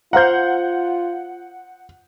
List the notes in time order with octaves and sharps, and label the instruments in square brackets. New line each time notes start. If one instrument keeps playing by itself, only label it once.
[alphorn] F4 [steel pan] C5 F5 A#5 [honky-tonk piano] F#5 G6